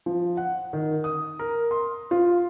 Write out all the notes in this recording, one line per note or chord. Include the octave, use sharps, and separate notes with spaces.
F3
F#5
D#3
D#6
A#4
C6
F4